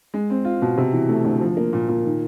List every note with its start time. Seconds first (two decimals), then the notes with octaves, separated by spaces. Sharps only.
0.14 G#3
0.30 C4
0.45 F4
0.62 B2
0.78 C3
0.93 E3
1.09 A3
1.25 D2
1.41 F3
1.57 A#3
1.73 A#2
1.89 A#2
2.05 D#3